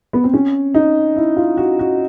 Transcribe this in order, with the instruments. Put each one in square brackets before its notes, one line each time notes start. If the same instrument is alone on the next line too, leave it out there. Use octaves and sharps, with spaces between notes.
[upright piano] B3
C4
C#4
D#4
E4
F4
F#4
F#4